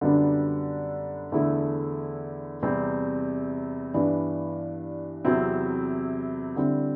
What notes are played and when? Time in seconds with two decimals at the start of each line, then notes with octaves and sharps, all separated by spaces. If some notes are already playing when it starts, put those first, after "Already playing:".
0.01 F#2 D3 G3 B3 D4
1.32 E2 D3 A3 E4
2.63 E2 C3 G3 C4
3.94 G2 E3 B3 D4
5.25 E2 C3 F#3 C4 E4
6.56 D3 G3 C4 E4